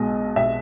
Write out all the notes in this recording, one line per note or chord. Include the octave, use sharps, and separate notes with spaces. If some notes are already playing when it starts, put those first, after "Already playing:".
Already playing: B1 B2 G#3 D#5
B1 E5